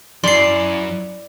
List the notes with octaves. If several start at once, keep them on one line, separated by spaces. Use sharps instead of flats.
F#2 E4 D5 C6 C7